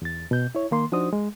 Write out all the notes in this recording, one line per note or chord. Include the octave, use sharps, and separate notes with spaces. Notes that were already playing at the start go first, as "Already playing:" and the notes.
E2 A6
B2 G6
E4 C#5
D#3 A#3 C6
F3 D4 D#4 F#4 C5 D#6
G#3